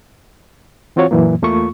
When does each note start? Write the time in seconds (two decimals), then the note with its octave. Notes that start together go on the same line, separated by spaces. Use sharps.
0.96 E3 C4 F4 F#4 C#5
1.11 F#2 A#2 E3 F#3 A#3
1.42 E2 A3 A#3 F4 C#6